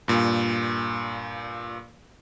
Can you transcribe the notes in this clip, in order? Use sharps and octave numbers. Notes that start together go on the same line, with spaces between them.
G2 A#2